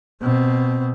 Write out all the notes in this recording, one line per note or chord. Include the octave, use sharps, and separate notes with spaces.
B2 C4